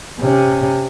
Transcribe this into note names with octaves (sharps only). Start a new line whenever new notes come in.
C3 C#4